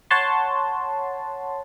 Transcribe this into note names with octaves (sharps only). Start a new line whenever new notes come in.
C#5 F#5 A5 C6